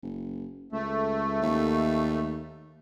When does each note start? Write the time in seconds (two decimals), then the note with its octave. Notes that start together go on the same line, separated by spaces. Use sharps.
0.03 F#1
0.72 C#2 A3
1.42 D#2